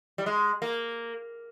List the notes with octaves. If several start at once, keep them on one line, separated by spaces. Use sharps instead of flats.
G3
G#3
A#3